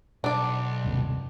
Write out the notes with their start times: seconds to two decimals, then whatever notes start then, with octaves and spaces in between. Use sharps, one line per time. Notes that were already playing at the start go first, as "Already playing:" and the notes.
0.24 B1 D4 D5
0.84 G1 D#2 C3